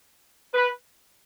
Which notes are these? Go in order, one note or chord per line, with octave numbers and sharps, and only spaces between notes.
B4